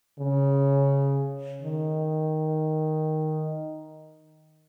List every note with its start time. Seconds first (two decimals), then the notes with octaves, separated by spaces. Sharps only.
0.19 C#3
1.62 D#3